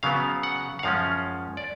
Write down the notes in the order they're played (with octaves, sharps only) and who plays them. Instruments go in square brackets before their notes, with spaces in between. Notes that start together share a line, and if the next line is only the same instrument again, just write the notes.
[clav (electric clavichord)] C#3 F#3 B3 F5
F#5
F#5
F#2 F3 G#3 C#4 F5
D5